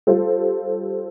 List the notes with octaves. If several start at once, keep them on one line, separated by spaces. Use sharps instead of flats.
G3 F4 A4 C5